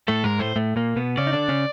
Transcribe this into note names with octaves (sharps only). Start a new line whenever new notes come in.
A2 A3 A4
G#2 G#3 A#4
A2 A3 C5
A2 A3
A#2 A#3
B2 B3
C#3 C#4 D5
D#4
D3 D4
C#3 C#4